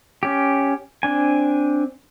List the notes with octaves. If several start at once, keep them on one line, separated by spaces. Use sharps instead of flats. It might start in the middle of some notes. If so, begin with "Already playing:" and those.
C#4 G4
C4 D4 G#5